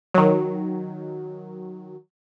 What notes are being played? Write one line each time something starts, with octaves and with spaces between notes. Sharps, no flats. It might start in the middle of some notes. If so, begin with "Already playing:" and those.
D#3 F#3